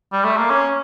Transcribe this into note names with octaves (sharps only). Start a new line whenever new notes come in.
G3
A3
A#3
C#4